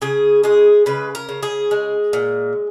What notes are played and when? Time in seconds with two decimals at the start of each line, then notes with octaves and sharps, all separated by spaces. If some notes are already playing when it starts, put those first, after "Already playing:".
0.02 C#3 G#4
0.44 G#3 G#4
0.86 C#3 B4
1.15 A#4
1.29 C#3
1.43 G#4
1.71 G#3
2.13 A#2